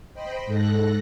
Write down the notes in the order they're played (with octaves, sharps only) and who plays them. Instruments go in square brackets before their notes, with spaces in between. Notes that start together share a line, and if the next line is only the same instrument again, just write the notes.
[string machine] C5 D#5 G5 B5
G#2 A4 F#6 A#6